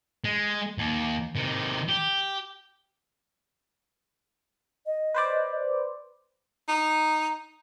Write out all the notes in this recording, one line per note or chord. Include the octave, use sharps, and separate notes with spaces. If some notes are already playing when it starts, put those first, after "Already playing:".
G#3
D#2
C3 D#3
G4
D#5
B4 C5 D5
D#4